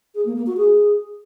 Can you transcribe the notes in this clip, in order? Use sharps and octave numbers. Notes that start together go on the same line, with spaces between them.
G#4
A#3
A#3
F#4
G#4